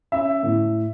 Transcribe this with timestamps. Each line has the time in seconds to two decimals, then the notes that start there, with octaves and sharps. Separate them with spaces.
0.12 C#4 E5
0.43 A2